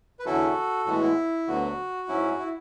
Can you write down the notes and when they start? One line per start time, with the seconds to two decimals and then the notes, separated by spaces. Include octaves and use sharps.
0.19 B4
0.25 E2 D3 F#3 C#4 E4 F#4 A4
0.86 A2 E3 G#3 B3 F#4
1.01 E4
1.47 D2 D3 F#3 B3 F#4
2.08 G#2 F#3 C#4 E4
2.39 E4